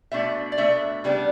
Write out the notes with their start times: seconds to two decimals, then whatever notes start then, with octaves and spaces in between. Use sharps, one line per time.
0.12 B2 A3 D4 E5
0.52 D5
0.58 B2 A3 D4 E5
1.04 C#3 G3 B3 D4